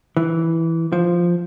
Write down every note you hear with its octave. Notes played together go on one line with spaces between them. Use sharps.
E3
F3